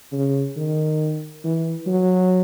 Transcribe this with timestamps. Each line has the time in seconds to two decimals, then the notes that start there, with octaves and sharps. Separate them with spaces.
0.12 C#3
0.56 D#3
1.44 E3
1.87 F#3